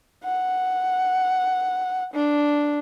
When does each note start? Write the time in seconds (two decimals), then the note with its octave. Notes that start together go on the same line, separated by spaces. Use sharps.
0.24 F#5
2.13 D4